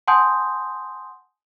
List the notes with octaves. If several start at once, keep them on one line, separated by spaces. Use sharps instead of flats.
F#5 G#5 A5 C6 D#6 G6